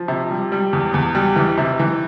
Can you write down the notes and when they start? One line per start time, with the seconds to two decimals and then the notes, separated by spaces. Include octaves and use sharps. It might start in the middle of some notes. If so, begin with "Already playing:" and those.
Already playing: F3
0.08 C3
0.31 G3
0.52 G3
0.73 E2
0.94 E2
1.15 G3
1.36 E3
1.58 C3
1.79 E3